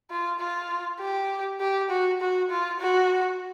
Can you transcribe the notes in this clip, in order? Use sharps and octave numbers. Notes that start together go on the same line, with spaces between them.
F4
F4
G4
G4
F#4
F#4
F4
F#4